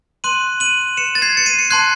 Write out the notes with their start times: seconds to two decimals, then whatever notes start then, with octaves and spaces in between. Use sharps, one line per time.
0.24 C6 F#6 D#7 F#7
0.60 D#7 F#7
0.97 C#7 E7
1.15 A6
1.22 G#6 C7
1.37 C#7
1.46 C7 D#7
1.59 C#7
1.71 A5 C6 F#6 G#6 C7